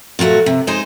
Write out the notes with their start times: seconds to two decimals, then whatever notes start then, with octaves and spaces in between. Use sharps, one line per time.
0.19 A#2 F#3 A3 F#4
0.46 C3
0.67 G#3 D#4 C5 D#5